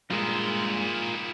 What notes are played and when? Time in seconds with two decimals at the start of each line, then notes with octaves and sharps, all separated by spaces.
0.11 G2 D#3 G#3 E4 F4 A#4